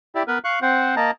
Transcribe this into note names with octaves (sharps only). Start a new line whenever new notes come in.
E4 G4 D5 E5
B3 A#4 B4
F5 C#6 F#6
C4 C5 F#5
A#3 D#5 A5 A#5